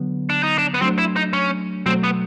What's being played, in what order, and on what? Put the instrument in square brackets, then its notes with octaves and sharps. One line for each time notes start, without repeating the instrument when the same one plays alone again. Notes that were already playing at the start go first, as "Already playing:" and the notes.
Already playing: [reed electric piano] D3 F#3 B3
[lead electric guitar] D4
D#4
D4
B3
[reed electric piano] F#3 A3 D4 [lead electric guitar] C4
[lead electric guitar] E4
D#4
C#4
[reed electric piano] B2 F#3 A3 [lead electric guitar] C4
[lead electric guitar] B3